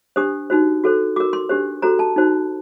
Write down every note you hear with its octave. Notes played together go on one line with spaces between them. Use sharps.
D4 G4 C5 D#6
D#4 F#4 C5
F#4 A4 C5
F#4 A#4 D6
C6
D4 G4 C5
F#4 A4 C5 A#5
A5
D#4 F#4 C5